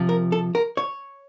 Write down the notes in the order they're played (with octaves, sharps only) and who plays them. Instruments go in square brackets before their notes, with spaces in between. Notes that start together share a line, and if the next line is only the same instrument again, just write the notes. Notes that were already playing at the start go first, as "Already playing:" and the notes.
Already playing: [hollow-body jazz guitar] C3 F3
A#4
A4
A#4
C#5